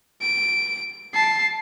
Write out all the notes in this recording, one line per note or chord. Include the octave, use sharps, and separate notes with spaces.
D7
A5 C7